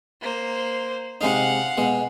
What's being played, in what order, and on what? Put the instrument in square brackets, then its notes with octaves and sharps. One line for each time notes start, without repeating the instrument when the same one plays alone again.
[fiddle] A#3 C5
[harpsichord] C3 G#3 D#4 [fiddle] F5 F#5
[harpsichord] B2 G#3